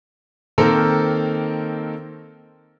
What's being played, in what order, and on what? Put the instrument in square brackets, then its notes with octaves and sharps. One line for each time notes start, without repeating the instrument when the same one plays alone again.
[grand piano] D#3 A#3 C4 A4 A#4 C5